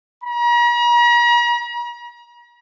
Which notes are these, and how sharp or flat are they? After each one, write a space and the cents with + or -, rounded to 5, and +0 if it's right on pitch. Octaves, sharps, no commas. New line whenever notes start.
A#5 +45